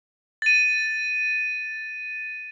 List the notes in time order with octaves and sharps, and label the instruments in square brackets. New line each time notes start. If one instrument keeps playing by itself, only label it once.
[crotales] A6 D#7